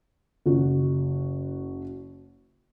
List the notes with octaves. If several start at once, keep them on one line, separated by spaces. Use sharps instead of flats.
F#1 F#4